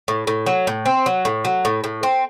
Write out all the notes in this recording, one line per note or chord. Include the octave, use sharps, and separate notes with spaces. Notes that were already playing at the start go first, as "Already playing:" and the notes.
A2
A2
F#3
A2
C4
F#3
A2
F#3
A2
A2
C4